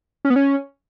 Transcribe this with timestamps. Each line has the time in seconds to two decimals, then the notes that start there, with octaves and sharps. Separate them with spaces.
0.25 C#4
0.30 B3
0.36 C#4